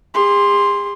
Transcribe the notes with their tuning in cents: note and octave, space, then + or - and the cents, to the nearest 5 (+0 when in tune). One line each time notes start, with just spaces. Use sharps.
G#4 -45 C6 +0